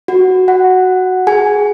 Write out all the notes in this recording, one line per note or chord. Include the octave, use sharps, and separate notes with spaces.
F#4
F#4 F#5
G#4 G#5